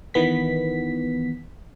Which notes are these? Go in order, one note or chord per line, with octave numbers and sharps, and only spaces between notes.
D#3 E3 B3 B6